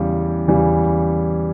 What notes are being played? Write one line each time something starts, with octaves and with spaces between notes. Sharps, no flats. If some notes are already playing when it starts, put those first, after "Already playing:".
Already playing: E2 C#3 E3 G3
E2 C#3 E3 G3